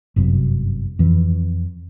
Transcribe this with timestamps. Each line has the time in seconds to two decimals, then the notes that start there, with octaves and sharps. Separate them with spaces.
0.16 G1 F#2 C3
0.99 F2 E3